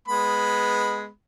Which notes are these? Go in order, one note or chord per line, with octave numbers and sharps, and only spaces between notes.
G#3 B3 B5